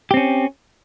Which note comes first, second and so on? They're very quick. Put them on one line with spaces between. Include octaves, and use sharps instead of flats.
G4 C4 C#4